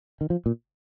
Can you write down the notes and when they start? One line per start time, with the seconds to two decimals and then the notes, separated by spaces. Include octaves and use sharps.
0.21 D#3
0.30 F3
0.46 A#2